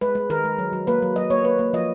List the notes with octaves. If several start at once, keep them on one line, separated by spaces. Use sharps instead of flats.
G#3 B4
G#3
D#3 A#4
G#3
F#3
F#3
A#3 B4
F#3
F#3 D#5
A#3 C#5
A#3 B4
A#3
F3 D#5